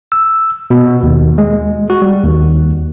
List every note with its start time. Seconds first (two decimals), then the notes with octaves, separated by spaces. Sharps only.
0.12 E6
0.70 B2
1.03 D#2
1.38 G#3
1.90 F#4
2.02 G3
2.24 D#2